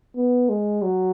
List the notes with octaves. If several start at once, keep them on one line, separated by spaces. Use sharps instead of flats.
B3
G#3
F#3